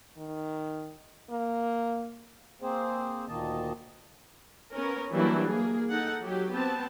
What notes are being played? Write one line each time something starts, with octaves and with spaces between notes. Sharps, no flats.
D#3
A#3
A#3 C4 G#4 C5
D2 A#2 D#3 A#3 D#5 A5
B3 C#4 A#4
E3 F#3 G3 A#3 D4 E4
A#3 G#4
D#4 A4 F#5
F#3 G4
B3 C4 A5